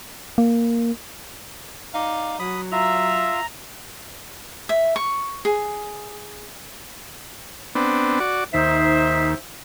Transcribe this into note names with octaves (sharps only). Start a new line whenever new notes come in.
A#3
D#4 D5 F5
F#3 B5 D#6
F4 E5 A#5
E5
C#6
G#4
B3 C4 D4
F#4 D5
D#2 D#4 C5 E5